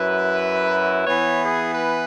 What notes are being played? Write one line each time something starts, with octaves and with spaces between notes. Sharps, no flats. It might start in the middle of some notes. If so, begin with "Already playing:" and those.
Already playing: F#2 F#3 E4 B4
E3 B3 E4 C#5
G#4
B4